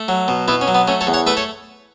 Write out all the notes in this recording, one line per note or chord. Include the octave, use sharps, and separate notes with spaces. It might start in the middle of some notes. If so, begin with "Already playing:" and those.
Already playing: A3
F#3
B2
B2 B3 E4
C#4
F#3
B3
A3 C#4
A4 C#5
E2
C#5 F#5
A3 B4 E5
A4 C#5